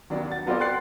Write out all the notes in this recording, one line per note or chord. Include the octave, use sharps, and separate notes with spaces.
D#2 F#3 B3 D4
F#5 A6
F#3 B3 F4 A4 C5 D5
G5 C6 F#6 A6 C7